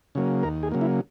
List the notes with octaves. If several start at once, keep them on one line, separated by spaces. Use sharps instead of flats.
C#3 F#3 A#3
D#2 A#4
G#4
C#3 F#3 A#3
E4